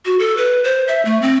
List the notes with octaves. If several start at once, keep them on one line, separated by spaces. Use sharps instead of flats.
F#4
A4
B4
C5
E5
A3
C4